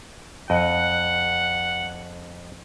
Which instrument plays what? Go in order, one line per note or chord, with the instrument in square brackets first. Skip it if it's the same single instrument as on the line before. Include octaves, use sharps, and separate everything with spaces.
[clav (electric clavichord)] F2 D#5 [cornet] F#5